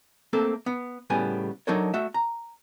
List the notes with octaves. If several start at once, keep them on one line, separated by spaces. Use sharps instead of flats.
A3 A#3 C4 A4
B3
A2 C#3 G3 B3 G#5
F#3 D4 D#4 A4 A#4 C#5
A3 F#4 E5
A#5